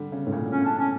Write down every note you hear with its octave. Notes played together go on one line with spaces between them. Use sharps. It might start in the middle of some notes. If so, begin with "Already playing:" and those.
Already playing: D3 G3
C#3
A2
A#2
C#4
D4
C#4